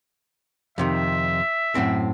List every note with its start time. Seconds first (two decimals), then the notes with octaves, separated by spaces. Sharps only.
0.78 F2 C3 D#3 E5
1.75 F#2 A2 C4